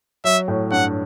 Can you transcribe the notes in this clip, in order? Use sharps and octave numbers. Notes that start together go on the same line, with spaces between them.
F#3 E5
A2
G2 F#5